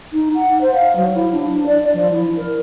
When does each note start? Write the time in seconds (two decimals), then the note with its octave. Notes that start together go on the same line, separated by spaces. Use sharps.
0.13 D#4
0.35 F#5
0.61 C5
0.75 F5
0.96 F#3
1.15 E4
1.33 D4
1.48 D4
1.67 D5
1.94 F3
2.12 E4
2.37 A#4